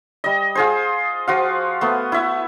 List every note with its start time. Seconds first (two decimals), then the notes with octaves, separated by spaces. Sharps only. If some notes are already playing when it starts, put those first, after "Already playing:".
0.24 G3 D#5
0.55 F4 G#4 C5
1.28 F3 F#4 F5
1.81 A3 B3
2.12 E4 E5